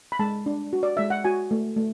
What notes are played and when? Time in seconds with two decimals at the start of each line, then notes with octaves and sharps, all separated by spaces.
0.12 B5
0.19 G#3 A5
0.46 D4
0.73 F#4
0.83 D5
0.97 G#3 E5
1.10 F#5
1.24 F#4 G#5
1.51 A3
1.77 A3